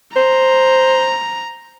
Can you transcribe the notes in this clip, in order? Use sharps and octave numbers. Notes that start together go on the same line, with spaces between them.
C5 A#5